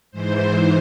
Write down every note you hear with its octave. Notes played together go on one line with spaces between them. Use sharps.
G#2 E3 C5